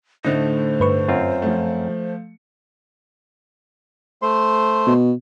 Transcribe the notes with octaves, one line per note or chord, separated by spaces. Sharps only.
A2 D3 A3 D#4 C5
G2 B4 C#6
F#2 C4 F4
F3 A3
A3 C5 C6
B2